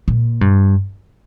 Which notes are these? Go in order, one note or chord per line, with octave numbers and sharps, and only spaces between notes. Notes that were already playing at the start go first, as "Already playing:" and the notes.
A#2
G2